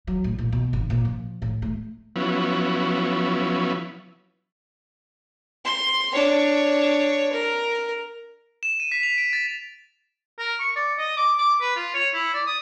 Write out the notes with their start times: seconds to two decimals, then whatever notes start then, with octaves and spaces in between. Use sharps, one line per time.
0.07 F#3
0.24 A2
0.38 A#2
0.52 B2
0.73 G#1
0.90 A#2
1.05 F3
1.42 A2
1.62 A3
2.16 F3 F#3 B3 C#4 E4
5.65 C6
6.13 D4 C#5
7.33 A#4
8.63 E7
8.80 D#7
8.92 B6
9.03 F7
9.18 D7
9.33 A6
10.38 A#4
10.60 C#6
10.76 D5
10.98 D#5
11.17 D6
11.38 D6
11.61 B4
11.76 F4
11.94 C#5
12.14 E4
12.34 D5
12.46 D#6